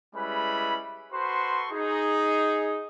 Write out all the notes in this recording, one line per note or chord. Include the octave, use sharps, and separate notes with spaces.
G3 G#3 C#4 E4 B4 B5
F#4 A4 B4 C5 C6 C#6
D#4 G#4